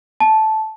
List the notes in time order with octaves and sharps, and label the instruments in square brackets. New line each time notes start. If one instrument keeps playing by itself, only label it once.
[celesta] A5